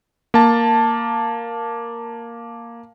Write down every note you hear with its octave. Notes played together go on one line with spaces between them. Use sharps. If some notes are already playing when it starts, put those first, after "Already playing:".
A#3 A5